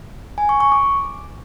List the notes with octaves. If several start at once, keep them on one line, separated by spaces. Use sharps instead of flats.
G#5
C#6
C#6
D6